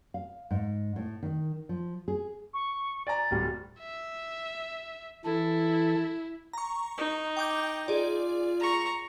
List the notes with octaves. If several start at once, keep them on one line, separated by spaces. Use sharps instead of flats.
F5
G#2
A2
D#3
F3
G#4
C#6
D5 G#5 A#5 A6
D1 G3
E5
E3 E4 A4
A#5 C#6
D#4
G5 D6 G6
F4 G#4 D5
A#5 C#6